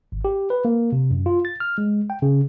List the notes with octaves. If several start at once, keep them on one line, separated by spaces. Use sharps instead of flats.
G#1
G4
B4
A#3
C3
F#2
F4
A6
F6
G#3
G5
C#3